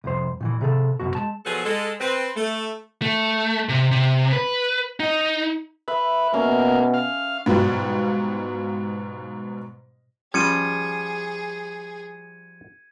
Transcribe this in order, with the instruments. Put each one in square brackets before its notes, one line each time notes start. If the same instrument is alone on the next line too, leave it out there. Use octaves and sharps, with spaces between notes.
[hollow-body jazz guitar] C2 F2 C5
A#2 D#3 E3
C3 G#4 A4
C2 F#2 B2 F#4
G#3 A5
[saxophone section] B2 F3 F#3 G#4 A4 B4
G#3 A4
C4 B4
A3
[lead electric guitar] A3
C3
C3
B4
D#4
[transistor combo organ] B4 [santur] E5
[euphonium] B2 [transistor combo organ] A#3 [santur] C#4
[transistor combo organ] F5
[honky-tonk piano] G#2 B2 F#3 G3 F4
[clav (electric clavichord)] F3 G3 [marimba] C#4 [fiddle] G#4 [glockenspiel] G#6 C#7 D#7